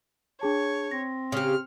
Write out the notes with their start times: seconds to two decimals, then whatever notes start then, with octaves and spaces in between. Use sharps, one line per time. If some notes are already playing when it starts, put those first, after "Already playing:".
0.41 D4 G#4 C#5 A5
0.91 C4 A#6
1.32 C#3 G4 F6